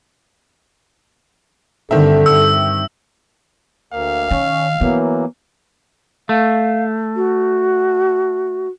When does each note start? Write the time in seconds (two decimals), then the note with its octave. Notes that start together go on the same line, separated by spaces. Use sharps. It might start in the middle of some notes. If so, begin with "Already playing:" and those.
1.91 G2 D3 D#3 C4 A4 E5
2.26 G2 E6
3.93 D2 A#3 F5
4.31 D#3 C#4
4.81 E3 F#3 A#3 B3
6.29 A3 F5
7.16 F#4